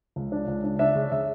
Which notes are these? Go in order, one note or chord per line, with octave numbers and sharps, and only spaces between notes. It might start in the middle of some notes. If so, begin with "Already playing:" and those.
C#2
D4
C#2
D4
D4 E5
C#3
C#3 E5